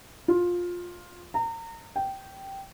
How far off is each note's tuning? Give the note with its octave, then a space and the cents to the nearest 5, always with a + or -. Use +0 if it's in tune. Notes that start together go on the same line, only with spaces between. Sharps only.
F4 +15
A#5 -30
G5 -10